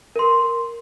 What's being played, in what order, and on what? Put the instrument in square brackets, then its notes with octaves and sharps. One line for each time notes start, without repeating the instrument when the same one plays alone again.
[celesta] A#4 C6